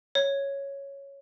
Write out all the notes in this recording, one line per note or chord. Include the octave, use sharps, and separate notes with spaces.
C#5